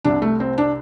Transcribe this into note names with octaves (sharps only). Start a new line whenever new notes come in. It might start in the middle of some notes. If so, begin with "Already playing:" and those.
C2 C3 D4
A3
C4
D4